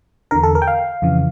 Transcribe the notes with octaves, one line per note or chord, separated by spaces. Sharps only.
E2 D3 A#4
A4
A#4
G5
F5
F2 C#3 E3